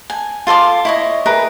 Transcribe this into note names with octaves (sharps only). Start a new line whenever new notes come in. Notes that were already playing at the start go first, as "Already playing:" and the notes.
G#5
F4 A4 C6 D6
E4 C#5 D#5
E4 G#4 A#4 B4